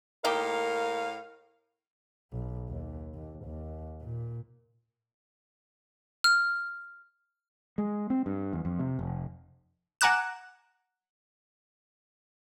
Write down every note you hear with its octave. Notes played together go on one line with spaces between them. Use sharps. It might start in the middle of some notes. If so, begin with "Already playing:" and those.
A2 A#3 D#4 G4 A#4 F5
B1
D#2
D#2
D#2
A#2
F6
G#3
C4
G2
E2
F2
C3
F1
F#5 G#5 A#5 D6 F#6 E7